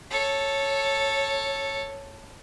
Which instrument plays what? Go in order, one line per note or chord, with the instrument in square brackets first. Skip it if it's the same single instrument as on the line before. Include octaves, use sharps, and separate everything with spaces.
[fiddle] A4 C#5